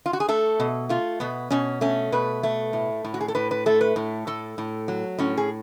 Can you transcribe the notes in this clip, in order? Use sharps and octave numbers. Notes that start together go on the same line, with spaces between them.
F4
F#4
G#4
A3 A4
B2
A3 F4
B2 B3
B2 C#4
A3 C#4
B2 B4
A3
A2
A2
F#4
G#4
A4
A2 B4
B4
A3 A4
B4
A2
A2 A4
A2
F#3
A2 C#4
G#4